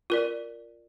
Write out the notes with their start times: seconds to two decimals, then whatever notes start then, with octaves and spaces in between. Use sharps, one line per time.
0.10 F4 A#4 D5